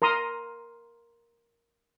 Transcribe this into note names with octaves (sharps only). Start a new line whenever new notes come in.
A#4 A#5 C6 D#6